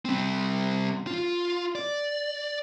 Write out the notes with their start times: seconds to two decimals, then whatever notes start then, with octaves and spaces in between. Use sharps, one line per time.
0.05 G3 C4
1.07 F4
1.75 D5